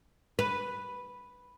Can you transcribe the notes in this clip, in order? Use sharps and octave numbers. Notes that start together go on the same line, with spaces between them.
B4